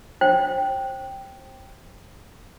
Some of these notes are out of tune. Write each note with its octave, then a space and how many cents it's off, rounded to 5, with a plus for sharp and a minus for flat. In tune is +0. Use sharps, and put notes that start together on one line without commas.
C5 +30 G5 +0